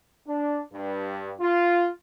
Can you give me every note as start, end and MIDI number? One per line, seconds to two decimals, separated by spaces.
0.27 0.60 62
0.73 1.32 43
1.40 1.87 65